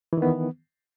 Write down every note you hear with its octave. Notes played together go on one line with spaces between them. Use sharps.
D#3 E3 B3